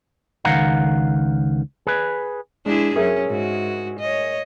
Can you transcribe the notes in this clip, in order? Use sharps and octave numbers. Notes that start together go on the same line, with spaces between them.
C#2 D#3 F5 F#5 A#5
G#4 B4
G#3 D4 E4 G#4
F#2 C#4 G#4 A#4 E5
G#2 F#4
C#5 D#5